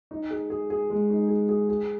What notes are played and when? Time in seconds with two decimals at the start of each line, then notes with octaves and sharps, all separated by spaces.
0.11 D#4
0.31 G#4
0.50 G#4
0.70 G#4
0.90 G#3
1.10 D#4
1.29 G#4
1.49 G#4
1.69 G#4